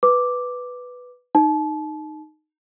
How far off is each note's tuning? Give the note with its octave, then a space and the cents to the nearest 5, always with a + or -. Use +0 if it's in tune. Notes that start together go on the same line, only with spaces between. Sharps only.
B4 +0 D6 +0
D#4 -10 A5 -35